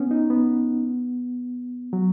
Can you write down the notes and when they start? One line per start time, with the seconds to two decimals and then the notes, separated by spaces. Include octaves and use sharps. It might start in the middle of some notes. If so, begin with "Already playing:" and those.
Already playing: B3 C#4
0.11 D#4
0.30 B3
1.93 F#3